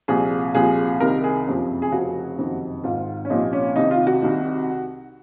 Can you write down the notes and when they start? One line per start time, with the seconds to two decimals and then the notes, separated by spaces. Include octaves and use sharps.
0.08 C2 A#2 F3 G#4
0.55 C2 A#2 F3 G#4
1.00 C2 C3 D#3 A#4
1.24 G#4
1.47 F#1 F2 C3 F3
1.82 G#4
1.92 F1 F2 C#3 F3 F#4
2.38 F#1 F2 C3 D#3
2.84 G#1 G#2 D#3 F4
3.25 C#4
3.30 C2 A#2 F3 D#4
3.53 C#4
3.76 C2 C3 D#3 D#4
3.91 F4
4.07 F#4
4.22 C2 C3 D#3